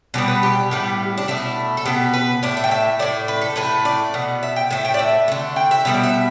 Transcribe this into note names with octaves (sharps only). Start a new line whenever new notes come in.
B2 G3 B3 D5
B4
G4
A2 G3 B3
D4
B2 A3 E4
A4
B2 B3 G4
B4
A2 A3 D5
E5
G5
E5
A2 A3 D5
B4
A4
A2 A3 B4
D5
B2 B3
E5
G5
A2 A3 E5
G5
D5
E5
D3 A3
G5
E5
B2 G3 B3 E5
D5
E5